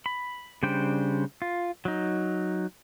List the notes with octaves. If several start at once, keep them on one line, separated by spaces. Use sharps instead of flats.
B5
C#3 G3 D4 C5 G5
F4
F#3 D#4